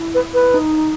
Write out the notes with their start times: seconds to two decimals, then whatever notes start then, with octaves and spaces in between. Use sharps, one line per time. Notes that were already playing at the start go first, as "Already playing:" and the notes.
Already playing: E4
0.15 B4
0.34 B4
0.54 D#4